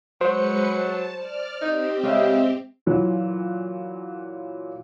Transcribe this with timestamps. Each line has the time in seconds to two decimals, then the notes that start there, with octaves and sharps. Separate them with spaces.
0.21 F#3 G#3 B4 C5 C#7
0.73 A5
1.15 D5 F6
1.61 C4 D#4 G4
2.03 C#3 G#3 D#5 E5
2.86 A#2 E3 F#3